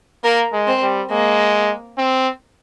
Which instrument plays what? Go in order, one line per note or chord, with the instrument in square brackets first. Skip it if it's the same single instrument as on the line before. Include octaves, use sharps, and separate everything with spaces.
[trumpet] A#3 [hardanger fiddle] A#4
[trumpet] G#3
[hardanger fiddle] C4
[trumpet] G3
[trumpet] G#3 [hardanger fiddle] A#3
[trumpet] C4